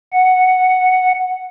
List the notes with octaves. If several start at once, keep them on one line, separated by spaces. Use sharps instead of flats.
F#5